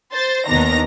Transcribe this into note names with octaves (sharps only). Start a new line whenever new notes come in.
C5 A6
D#2 D#3 B3 D4 A#5 A#6